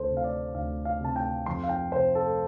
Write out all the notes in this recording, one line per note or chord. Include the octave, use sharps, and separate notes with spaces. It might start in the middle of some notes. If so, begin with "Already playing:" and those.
Already playing: D2 A4 C5
C3
F5
D5
D2 F5
F5
C3 A5
G5
F2 C6
F5
G5
C3 C5
A4